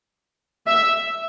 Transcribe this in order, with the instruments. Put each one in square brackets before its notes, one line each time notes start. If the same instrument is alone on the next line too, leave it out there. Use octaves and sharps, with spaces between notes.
[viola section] E5